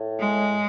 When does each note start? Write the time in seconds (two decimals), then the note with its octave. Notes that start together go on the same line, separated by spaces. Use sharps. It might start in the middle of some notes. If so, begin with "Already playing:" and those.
Already playing: A2
0.20 G#3